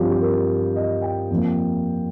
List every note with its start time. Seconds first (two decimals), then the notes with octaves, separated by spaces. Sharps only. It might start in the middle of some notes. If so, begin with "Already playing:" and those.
Already playing: G2 F3 C4 F4 G4
0.11 G4
0.21 A#4
0.76 D#5
1.02 G5
1.30 F2 F3 A#3